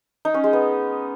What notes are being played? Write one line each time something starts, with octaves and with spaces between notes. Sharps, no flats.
D#4
C#4
G#3
B3